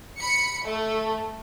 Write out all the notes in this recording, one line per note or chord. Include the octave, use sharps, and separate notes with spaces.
B5 C#7
A3